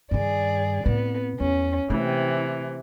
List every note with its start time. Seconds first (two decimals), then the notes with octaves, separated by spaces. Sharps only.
0.11 G2 D#3 G#4 D5
0.86 A2 B3 C4
1.40 E2 C#4
1.90 C3 E3 A3 A#3